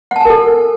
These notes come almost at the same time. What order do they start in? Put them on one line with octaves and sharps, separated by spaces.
F#5 A5 G#5 A#4 A4